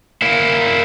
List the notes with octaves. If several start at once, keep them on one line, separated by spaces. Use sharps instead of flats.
A#3 E4